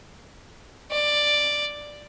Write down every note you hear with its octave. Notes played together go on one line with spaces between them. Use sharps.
D5